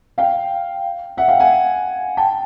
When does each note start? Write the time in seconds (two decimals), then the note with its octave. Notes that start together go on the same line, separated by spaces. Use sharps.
0.18 F5 G5
1.17 E5 F#5
1.28 F5 G5
1.40 F#5 G#5
2.17 G5 A5